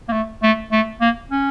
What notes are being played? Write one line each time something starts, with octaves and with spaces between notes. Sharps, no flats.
A#3
A3
A3
A3
A#3
C#4